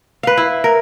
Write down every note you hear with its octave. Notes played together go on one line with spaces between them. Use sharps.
B4 F5
E4
A#4